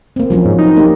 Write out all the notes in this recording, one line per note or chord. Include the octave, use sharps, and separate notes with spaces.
A#3 C4
F3 F#3 C#4
G#2
D#4
A#3 G4